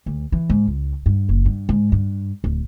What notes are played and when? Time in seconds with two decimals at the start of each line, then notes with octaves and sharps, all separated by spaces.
0.06 D2
0.32 E3
0.50 G#2
0.67 C#2
1.06 G2
1.29 F#1
1.46 G2
1.69 G#2
1.92 G2
2.44 D1